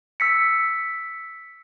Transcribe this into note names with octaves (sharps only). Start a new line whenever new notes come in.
E6 B6 C#7